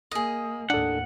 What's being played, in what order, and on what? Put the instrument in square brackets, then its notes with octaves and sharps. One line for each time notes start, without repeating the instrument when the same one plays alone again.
[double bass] A#3 [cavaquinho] G#4 D#5
[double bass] D#2 A2 [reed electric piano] D4 A4 [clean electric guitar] F#5